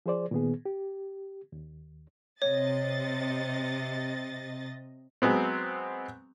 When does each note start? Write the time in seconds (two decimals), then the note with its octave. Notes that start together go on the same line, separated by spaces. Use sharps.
0.06 F3 G#4 C5 D5
0.31 A#2 D#3 B3 G#4
0.65 G4
1.52 D#2
2.42 C3 C#5 D#5 A6
5.22 F#3 G#3 B3 C4